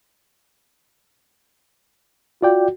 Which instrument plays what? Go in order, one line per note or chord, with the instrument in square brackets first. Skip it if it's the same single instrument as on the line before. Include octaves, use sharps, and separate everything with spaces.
[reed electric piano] F4 D5 G5 [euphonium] F#4